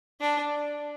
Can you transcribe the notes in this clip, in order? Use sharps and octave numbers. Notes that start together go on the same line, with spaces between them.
D4